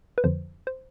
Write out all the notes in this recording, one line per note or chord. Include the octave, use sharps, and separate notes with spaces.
B4
F2 D3 F3 C5
C5